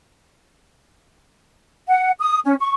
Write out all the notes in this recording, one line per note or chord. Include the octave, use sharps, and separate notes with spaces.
F#5
D#6
C#4
C#6